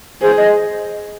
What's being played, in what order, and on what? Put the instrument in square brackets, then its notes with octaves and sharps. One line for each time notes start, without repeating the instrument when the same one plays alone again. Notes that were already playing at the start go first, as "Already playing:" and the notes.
[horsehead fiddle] G#4 [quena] C5
[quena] D#5